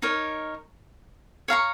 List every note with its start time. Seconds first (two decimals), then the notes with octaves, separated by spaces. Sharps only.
0.02 D#4 A#4 C#5
1.48 C#5 F5 A#5 C#6